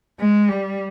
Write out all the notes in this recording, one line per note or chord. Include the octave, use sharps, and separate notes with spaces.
G#3
G3